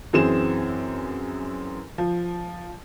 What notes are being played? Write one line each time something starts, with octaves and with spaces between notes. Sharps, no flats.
F#2 E3 C4 G#4 E7
F3